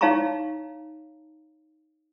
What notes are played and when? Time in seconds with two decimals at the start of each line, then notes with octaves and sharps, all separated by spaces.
0.01 D#4 C#5 F5 A5 A#5 C#6